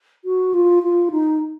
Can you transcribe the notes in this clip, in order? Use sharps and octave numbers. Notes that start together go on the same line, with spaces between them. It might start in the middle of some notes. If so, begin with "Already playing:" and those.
F#4
F4
F4
D#4